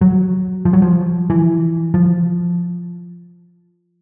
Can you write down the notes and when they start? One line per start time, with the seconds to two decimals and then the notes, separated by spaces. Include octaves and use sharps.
0.01 F#3
0.65 F3
0.73 F#3
0.82 F3
1.30 E3
1.94 F3